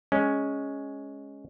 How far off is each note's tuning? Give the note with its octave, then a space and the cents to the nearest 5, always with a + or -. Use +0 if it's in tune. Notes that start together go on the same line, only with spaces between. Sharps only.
G#3 +0 C#4 +0